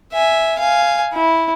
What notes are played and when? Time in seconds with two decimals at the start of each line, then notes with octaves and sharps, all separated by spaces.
0.13 E5 G#5
0.59 F5 G#5
1.14 E4